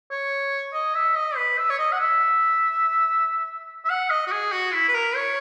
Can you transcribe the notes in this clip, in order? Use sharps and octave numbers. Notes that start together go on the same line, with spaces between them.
C#5
D#5
E5
D#5
B4
E5
C#5
D#5
F#5
E5
E5
F#5
D#5
F#4
G#4
F#4
E4
B4
A#4
C#5